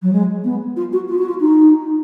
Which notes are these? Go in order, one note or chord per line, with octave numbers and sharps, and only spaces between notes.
F#3
G#3
B3
F4
F#4
F4
F#4
F4
D#4